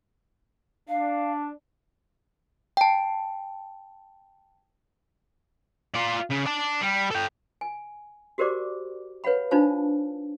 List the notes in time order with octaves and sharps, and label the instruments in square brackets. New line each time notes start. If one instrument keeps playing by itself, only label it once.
[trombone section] D4 [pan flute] F5
[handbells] G5 A5
[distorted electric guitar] F4 D5
C#3
D5 A5
G3
A4 G5
[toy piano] G#5
F#4 G4 A#4 C5 D5 D6
B4 C#5 F5 F#5 B5
D4 D#4 F4 C5 F5 A5